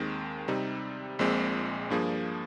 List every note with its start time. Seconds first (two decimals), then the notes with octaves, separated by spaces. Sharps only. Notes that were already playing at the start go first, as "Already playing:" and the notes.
Already playing: D#2 D#3 G#3 C4
0.48 C3 G3 C4 D#4
1.19 A#1 A#2 G#3 C4
1.90 G2 F3 A#3 D4 G#4